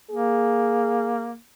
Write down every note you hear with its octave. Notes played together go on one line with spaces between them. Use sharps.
A#3 G#4